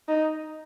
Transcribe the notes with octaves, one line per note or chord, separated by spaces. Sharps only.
D#4